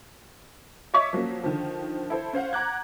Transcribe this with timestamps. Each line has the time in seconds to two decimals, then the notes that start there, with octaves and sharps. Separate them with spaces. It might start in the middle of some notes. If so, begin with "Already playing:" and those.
0.94 C#5 D#5 E5 C#6 D6 B6
1.13 F3 F#3 A#3 C#4
1.44 D3 D#3 F3
2.10 E4 A4 C5
2.33 C#4 C5 F5 F#5
2.53 F#5 A#5 D6 F#6 G#6